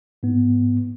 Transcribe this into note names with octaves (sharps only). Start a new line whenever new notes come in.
G#2 B3